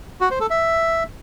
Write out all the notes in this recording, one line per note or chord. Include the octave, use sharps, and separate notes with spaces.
F#4
C5
A4
E5